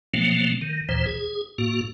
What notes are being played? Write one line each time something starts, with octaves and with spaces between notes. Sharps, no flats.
B2 F3 F#3 A3 A#3 C4
D#3
D#2 A#2 E3 C5
G#4
A2 A#3 F#4